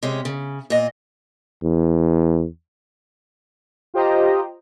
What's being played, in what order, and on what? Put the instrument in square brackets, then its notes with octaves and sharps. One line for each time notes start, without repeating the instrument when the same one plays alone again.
[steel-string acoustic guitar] C3 G#3 C#4
C#3
A#2 D#5
[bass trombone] E2
[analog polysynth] F4 G4 C5 D#5 G5 A#5